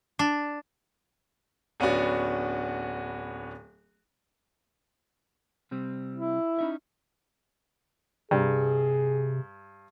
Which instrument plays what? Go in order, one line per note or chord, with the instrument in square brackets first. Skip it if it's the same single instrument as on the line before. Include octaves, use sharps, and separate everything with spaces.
[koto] D4
[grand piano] D1 B3 C#4 D4 F#4
[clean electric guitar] C3 G3 C4
[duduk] E4
[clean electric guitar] C#4 D#4 E5
[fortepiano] G2 [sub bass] C3 [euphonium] G#4